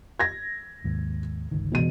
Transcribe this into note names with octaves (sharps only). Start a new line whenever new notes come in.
G#6 A#6
D#2 G#2
G1 C#2 D#3
E1 B2 D#7